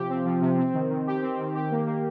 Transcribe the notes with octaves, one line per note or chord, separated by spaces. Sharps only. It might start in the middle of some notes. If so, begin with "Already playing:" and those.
Already playing: C3 F3 G4
C4
F3
C3
C4
D#3
D#3
G4
C4
D#3
G4
A#3
A#3